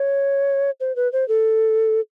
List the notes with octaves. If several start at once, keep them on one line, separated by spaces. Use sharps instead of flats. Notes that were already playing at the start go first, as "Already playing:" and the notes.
Already playing: C#5
C5
B4
C5
A4